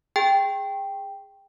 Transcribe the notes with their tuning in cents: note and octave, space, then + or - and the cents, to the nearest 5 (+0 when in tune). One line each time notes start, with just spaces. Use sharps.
G#4 -15 G5 +0